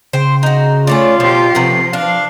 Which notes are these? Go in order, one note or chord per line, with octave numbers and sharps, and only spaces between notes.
C#3 C5 G5
D#4 F#4
A3 C#4 F4 C#5 D5
B2 F3 G4 C7
C3 F3 A3 B3
D4 F5